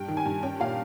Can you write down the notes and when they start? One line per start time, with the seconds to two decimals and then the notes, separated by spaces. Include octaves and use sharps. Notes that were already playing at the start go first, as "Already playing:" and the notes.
Already playing: G2 G5
0.08 D#3
0.17 G#5
0.26 G2
0.43 C#4 G5
0.60 A#2 F5